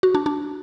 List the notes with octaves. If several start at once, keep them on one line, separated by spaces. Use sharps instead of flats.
F#4
D4
D4